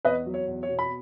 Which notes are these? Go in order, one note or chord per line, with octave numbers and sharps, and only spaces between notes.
E2 B4 D#5
F#3
C#5
E2
C#5
B2
B5